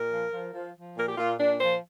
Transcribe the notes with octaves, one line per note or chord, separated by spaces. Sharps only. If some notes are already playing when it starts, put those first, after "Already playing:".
Already playing: A#2 A#4
F3
F3
F3
F3
A#2 A#4
G4
A#2 F4
A#2 D4
F3 C5